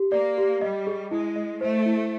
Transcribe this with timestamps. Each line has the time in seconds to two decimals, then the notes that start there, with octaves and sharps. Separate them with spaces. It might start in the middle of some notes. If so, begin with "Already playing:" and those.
Already playing: G4
0.12 A#3 D5
0.38 G4
0.61 G3 D#5
0.87 G#4
1.11 G#3 E4
1.36 D#5
1.61 A3 C5
1.86 E4